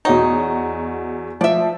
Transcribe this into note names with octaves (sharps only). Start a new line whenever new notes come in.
E2 D#4 F#4 C#5
F3 D5 E5